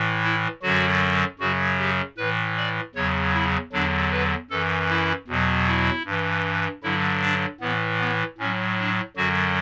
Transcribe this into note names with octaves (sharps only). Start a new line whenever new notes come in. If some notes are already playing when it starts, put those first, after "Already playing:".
Already playing: A2 E3
E4
F#2 D3 F#3 F#4
F#2 C#3 F#3 F#4
G4
A2 E3 B4
D5
E2 C#3 F#3 C#5
E4
E2 D3 F#3 D4
B4
F#2 E3 A4
E4
E2 B2 F#3
E4
G2 E3
G2 D3 F#3 E4
D4
A2 E3 B3
B3
A2 F#3 C#4
D4
F#2 D3 F#3 F#4